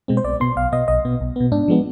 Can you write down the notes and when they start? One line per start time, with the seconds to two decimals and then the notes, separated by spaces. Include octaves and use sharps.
0.08 B2 G#3 C4
0.17 C5
0.24 B1 D5
0.40 B2 B3 C6
0.56 B1 F5
0.72 B2 B3 D#5
0.88 B1 D#5
1.05 B2 B3
1.21 B1
1.36 B2 B3
1.52 G#2 D4
1.68 F3 G#3 B3